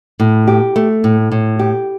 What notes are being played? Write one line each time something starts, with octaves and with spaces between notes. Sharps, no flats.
A2
G4
A3
A2
A2
G4